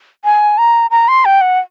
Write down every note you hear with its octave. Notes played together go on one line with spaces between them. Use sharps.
G#5
A#5
A#5
C6
G5
F#5